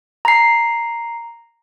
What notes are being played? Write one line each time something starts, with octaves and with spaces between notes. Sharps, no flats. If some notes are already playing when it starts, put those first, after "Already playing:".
A#5 C7